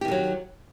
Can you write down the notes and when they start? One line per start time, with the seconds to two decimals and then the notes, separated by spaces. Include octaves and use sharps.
0.01 G4
0.05 D#3
0.08 D3
0.11 F#3